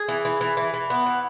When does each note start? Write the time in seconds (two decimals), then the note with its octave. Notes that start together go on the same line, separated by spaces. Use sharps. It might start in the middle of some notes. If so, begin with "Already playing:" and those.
Already playing: G#4
0.08 E3
0.25 E3
0.41 E3
0.57 E3
0.74 E3
0.90 B3
1.06 E3